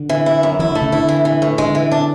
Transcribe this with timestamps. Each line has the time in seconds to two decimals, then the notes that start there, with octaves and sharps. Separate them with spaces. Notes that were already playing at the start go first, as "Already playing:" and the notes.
Already playing: D3
0.09 E3
0.26 E4
0.43 F#2
0.59 E3 E4
0.71 D3 A3
0.81 C#3
0.92 D3 E4
1.09 E3
1.25 E3
1.42 A2
1.58 D3 G#3
1.75 E3
1.92 D4